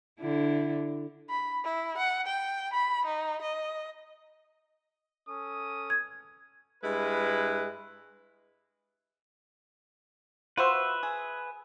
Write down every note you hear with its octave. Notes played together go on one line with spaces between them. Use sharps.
D3 E4
B5
E4
F#5
G5
B5
D#4
D#5
C#4 A4 D#6
G#6
G2 G#3 E4 B4
F4 F#4 B4 C5 E5
G#4